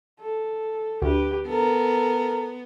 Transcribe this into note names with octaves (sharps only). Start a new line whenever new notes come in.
A4
D2 G4 B4
B3 A4 A#4